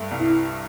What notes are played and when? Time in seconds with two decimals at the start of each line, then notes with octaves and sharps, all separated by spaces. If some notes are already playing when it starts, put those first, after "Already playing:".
Already playing: G2 A3
0.11 C2
0.19 E4